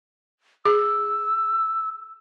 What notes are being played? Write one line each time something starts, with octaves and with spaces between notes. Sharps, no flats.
G#4 E6